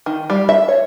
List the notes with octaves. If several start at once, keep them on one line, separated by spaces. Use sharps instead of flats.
D#3
G3
E5
C#5